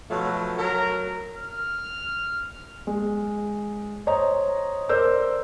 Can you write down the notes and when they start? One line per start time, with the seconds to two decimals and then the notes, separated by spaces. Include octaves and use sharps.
0.10 B2 F3 F#3 A3
0.58 F#3 A#4
1.38 F6
2.87 G#3
4.07 C5 C#5 D#5 A#5
4.89 A#4 C5 D5 E6 G6